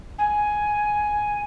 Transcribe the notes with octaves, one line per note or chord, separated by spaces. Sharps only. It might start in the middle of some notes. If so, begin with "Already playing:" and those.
G#5